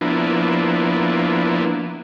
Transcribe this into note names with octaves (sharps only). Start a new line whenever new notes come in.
F3 A#3 B3 D4 E4